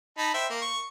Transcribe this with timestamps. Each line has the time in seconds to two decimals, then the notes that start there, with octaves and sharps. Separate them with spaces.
0.18 D#4 A5 B5
0.34 C5 E5 G5
0.50 A#3
0.62 C#6